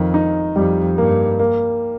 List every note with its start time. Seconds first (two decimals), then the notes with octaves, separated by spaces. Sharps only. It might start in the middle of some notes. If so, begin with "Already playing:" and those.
Already playing: F2 D#3
0.14 D#4
0.56 F2 G3
0.98 G2 A#3
1.39 A#3